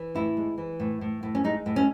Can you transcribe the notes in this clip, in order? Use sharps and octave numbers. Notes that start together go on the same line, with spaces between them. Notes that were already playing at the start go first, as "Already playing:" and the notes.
Already playing: E3
A2 E4
G#3
E3
A2
A2
A2
C#4
G#3 D#4
A2
C#4